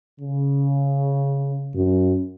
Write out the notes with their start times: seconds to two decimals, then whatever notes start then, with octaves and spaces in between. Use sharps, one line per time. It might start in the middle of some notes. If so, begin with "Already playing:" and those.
0.20 C#3
1.74 F#2